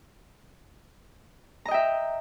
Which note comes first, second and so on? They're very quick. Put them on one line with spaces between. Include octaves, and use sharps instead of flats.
A#5 D#5 G5 E5